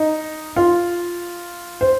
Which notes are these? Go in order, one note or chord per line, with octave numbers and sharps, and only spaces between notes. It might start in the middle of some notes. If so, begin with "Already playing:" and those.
Already playing: D#4
F4
C5